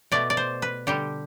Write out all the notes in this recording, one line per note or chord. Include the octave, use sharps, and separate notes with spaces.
B2 A3 D5
D5
C5
B4
D3 G3 G4